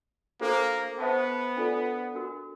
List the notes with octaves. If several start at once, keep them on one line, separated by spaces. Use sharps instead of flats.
A#3 D4 F#4 A4 C5 F5
B3 C5 E5 A5 C#6
D4 F4 A4 D5
D4 F#4 A#4